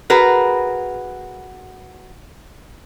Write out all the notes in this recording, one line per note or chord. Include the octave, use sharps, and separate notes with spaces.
F#4 G#4 A#4 B4